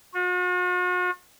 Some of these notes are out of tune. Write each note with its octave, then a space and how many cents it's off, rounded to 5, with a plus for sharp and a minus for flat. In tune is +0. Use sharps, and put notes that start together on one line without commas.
F#4 -45